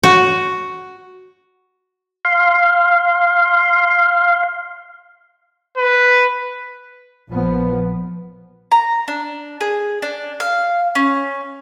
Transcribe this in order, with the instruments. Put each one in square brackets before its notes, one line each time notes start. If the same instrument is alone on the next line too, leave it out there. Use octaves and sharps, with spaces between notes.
[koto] F#4
[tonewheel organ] F5 C6
[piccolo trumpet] B4
[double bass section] A#1 A#2 F3 B3
[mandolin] A#5
D4
G#4
D4
F5
C#4